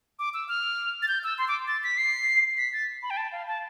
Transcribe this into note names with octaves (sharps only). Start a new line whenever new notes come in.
D6
E6
F6
A6
G6
E6
C6
D6
A6
B6
C7
B6
A6
B5
G5
A5
F5
A5